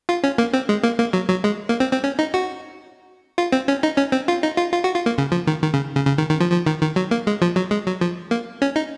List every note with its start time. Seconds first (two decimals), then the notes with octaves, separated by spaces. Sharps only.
0.09 F4
0.24 C#4
0.38 A#3
0.53 C4
0.69 G#3
0.83 A#3
0.99 A#3
1.13 F#3
1.29 F#3
1.44 G#3
1.69 A#3
1.80 C4
1.92 C4
2.04 C#4
2.19 D#4
2.34 F#4
3.38 F4
3.52 C4
3.68 C#4
3.83 D#4
3.98 C#4
4.12 C4
4.28 F4
4.43 D#4
4.57 F4
4.73 F4
4.84 F#4
4.94 F4
5.06 A#3
5.18 C#3
5.32 F3
5.47 D#3
5.63 D#3
5.74 C#3
5.95 C#3
6.07 C#3
6.18 D#3
6.30 D#3
6.40 F3
6.52 F3
6.66 D#3
6.81 D#3
6.96 F#3
7.11 A#3
7.27 G#3
7.42 F3
7.56 F#3
7.71 G#3
7.86 F#3
8.01 F3
8.31 A#3
8.62 C#4
8.76 D#4